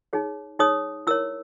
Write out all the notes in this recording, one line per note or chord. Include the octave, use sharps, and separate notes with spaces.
D#4 G#4 C#5
D#4 G#4 C#5 D#6
E4 A#4 C#5 E6